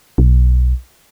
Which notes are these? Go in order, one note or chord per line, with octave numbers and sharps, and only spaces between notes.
B1